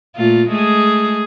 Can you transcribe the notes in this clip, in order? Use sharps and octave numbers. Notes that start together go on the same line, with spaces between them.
A#2 A3 F4
G#3 A3 G#4